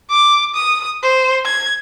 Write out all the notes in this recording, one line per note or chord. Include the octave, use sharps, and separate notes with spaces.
D6
D#6
C5
G#6